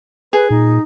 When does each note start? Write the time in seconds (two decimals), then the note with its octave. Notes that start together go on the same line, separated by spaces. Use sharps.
0.33 G#4 B4
0.50 A#2 D#4